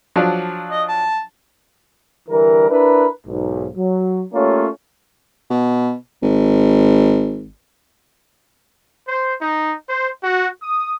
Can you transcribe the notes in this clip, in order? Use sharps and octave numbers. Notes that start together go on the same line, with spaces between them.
F3 F#3 D4
D#5
A5
D3 E3 G3 A#4
D4 E4 A#4 B4
B1 G#2
F#3
A3 A#3 C#4 F4 G4 C#5
B2
G#1
C5
D#4
C5
F#4
D#6